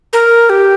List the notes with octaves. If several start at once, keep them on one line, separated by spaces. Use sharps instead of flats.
A#4
G4